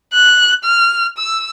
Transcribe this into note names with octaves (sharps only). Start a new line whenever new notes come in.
F#6
F6
E6